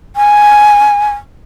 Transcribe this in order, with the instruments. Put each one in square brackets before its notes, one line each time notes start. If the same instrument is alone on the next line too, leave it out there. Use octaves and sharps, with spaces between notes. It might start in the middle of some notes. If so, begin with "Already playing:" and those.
[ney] G#5